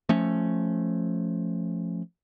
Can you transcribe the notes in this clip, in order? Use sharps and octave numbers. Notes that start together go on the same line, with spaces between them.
F3 A3 C#4